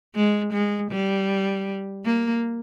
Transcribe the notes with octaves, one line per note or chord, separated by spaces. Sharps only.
G#3
G#3
G3
A#3